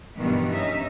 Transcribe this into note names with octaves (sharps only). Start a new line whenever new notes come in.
G2 B2 D#3 E3
C#4 D#4 E5